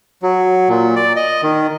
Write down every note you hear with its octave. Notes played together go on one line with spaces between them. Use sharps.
F#3
A#2
D5
D#5
D#3